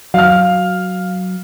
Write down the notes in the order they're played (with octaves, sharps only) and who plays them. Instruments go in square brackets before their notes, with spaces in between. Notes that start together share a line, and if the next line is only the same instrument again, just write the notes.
[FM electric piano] F#3 [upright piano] F5 F6